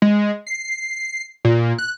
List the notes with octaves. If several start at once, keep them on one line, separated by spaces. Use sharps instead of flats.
G#3
C7
A#2
F#6